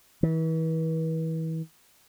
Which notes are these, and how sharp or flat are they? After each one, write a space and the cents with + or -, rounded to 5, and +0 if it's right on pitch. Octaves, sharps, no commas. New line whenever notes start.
E3 -35